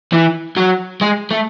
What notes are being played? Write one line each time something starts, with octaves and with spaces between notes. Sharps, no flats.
E3
F#3
G#3
A3